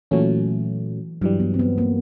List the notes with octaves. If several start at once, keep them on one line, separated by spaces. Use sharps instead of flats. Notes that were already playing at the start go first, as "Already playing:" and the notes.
A#2 E3 F#3 A3 C#4
G2 E3 F#3 G3
B3
C4
B3
A#3